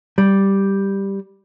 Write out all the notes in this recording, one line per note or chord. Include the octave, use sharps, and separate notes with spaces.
G3